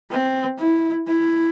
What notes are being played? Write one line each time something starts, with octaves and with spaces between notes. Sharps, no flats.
C4
E4
E4